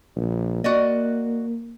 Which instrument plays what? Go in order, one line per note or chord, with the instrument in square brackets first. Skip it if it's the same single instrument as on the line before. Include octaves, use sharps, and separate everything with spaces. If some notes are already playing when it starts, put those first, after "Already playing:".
[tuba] A#1
[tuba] A#3 [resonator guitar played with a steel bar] F#4 D5 D#5